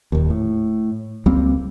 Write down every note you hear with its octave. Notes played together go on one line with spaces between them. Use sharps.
D#1 D#2
A2
C#2 G3 A#3 C4